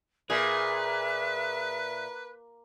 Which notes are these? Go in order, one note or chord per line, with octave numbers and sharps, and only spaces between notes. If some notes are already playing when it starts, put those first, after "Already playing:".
A#2 G#4 B4 E5